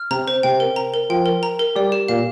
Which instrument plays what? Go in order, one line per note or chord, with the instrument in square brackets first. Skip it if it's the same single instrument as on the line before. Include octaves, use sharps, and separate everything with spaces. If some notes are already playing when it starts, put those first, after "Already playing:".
Already playing: [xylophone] F6
[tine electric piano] C3 C4 [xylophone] A#5
[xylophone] C5
[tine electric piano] C3 C4 [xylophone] G5
[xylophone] A#4
A#5
A#4
[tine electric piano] F3 F4 [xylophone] G5
[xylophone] A#4
A#5
A#4
[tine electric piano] G3 G4 [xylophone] D5
[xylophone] G4
[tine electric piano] A#2 A#3 [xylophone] F5